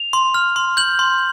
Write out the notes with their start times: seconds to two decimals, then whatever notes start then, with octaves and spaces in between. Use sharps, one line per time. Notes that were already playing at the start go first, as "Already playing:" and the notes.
Already playing: F7
0.13 C6
0.34 F6
0.56 C6
0.77 G6 F#7
0.99 C6